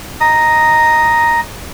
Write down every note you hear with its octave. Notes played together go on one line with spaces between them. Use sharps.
D#4 D#5 D#6